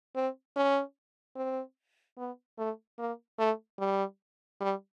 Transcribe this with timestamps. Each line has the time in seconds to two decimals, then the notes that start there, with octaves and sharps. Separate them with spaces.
0.16 C4
0.56 C#4
1.36 C4
2.18 B3
2.58 A3
2.99 A#3
3.39 A3
3.80 G3
4.61 G3